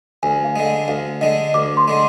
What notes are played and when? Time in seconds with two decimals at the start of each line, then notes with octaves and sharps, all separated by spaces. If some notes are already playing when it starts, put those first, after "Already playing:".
0.23 D2 G#5
0.45 F5
0.56 D3 G#3
0.66 F5
0.88 D2 F5
1.21 D3 G#3 D#5
1.54 D2 D6
1.77 C6
1.88 D3 G#3